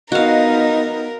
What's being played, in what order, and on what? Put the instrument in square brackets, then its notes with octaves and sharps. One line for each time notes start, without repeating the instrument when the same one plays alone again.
[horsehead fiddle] B3 D#4 [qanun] F#4 F5 [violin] A#4 [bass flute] D#5